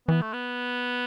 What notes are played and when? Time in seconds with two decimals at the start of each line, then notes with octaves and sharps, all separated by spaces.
0.08 E3 B3
0.22 A3
0.33 B3